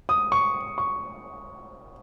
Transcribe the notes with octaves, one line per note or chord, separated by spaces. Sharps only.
D#6
C#6
C#6